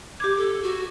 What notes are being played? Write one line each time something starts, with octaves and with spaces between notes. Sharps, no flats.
G4 D6 G#6
A4
F#4